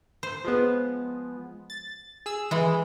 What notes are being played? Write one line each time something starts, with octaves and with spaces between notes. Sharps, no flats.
C5
F3 G#3 B3
A6
G#4 E6
E3 G#3